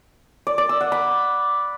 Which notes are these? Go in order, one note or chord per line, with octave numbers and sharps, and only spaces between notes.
D5
D5
E6
F#5
B5